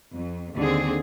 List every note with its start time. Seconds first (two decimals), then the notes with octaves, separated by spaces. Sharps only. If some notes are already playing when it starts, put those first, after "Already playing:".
0.16 F2
0.57 D#2 D3 C4 G#4